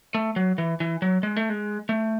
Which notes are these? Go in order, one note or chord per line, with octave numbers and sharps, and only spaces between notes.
A3
F#3
E3
E3
F#3
G#3
A3
G#3
A3